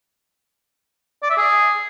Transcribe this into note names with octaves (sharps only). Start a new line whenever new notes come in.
D5
E5
G#4